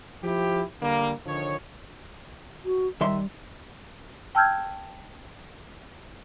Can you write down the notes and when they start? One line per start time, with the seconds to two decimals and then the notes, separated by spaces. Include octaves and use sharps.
0.24 F3 E4 G4
0.81 D3 G3 A#3
1.26 D3 D#3 F3 C#5
2.65 F#4
3.01 D#3 G3 E5 C6
4.35 G5 A5 E6 F6 G6 G#6